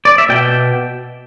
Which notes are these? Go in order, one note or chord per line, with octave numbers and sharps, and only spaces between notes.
D5
E5
B2 G5